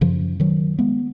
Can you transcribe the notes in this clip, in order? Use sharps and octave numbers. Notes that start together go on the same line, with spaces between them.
F#2 C#3 F3
D#3 F#3
G#3 B3